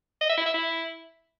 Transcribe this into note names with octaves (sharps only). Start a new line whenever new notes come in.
D#5
E5
E4
E5
E4